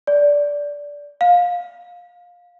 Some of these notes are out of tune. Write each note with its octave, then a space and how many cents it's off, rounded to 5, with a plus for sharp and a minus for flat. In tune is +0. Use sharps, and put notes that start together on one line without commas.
D5 -15
F5 +20